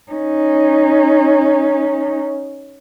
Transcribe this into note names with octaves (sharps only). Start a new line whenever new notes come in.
C#4 D#4